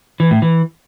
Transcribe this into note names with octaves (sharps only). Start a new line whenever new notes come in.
E3
A2
E3